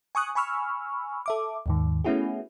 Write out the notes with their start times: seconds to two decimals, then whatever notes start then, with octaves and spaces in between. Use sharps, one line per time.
0.15 G#5 C#6 D#6 F#6
0.35 G#5 B5 C#6 E6 F6
1.26 A4 E5 D6
1.66 D#2 G#2 D#3
2.04 A3 B3 C#4 E4 F#4 G#4